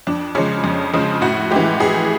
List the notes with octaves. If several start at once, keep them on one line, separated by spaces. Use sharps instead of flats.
F2 D4
C#3 F3 G#3 C#4
F2
C#3 F3 G#3
A2 F#4
G#3 G4
E3
A2 G#4